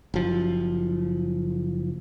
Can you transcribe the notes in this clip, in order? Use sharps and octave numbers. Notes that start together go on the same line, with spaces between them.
F#1 F3